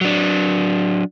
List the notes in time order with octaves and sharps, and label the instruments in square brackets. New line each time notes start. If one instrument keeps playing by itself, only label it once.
[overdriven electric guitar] F#3 D4